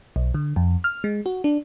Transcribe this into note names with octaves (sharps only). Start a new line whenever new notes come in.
B1
D3
F2
F6
G#3
F#4
D4